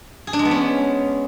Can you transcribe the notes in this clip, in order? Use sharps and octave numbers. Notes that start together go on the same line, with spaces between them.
G#4
D4
G#3
B3
C#4